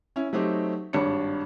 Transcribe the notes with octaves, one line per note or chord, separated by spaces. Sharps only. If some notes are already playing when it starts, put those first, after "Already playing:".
C#4 E4
F#3 A3 C4 D#4 G4
G#1 G2 D4 C#5 C#7